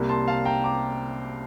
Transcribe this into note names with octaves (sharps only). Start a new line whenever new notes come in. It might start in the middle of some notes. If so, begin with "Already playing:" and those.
Already playing: C2 C3 G3 A#3
A5 C6
F5 A5
G5 A#5
A#5 D6